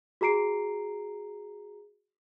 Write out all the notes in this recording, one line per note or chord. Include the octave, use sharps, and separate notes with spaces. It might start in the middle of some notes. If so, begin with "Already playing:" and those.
F#4 G#4 A#5 C7 D7